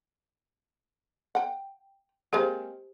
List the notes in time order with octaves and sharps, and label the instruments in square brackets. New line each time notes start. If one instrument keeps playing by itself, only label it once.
[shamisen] F#5 G5
[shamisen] G#3 A#3 C4 [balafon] G4 C5